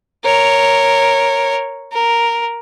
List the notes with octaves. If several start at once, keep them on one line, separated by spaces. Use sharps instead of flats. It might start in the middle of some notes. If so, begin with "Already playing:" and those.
A#4 C#5
A#4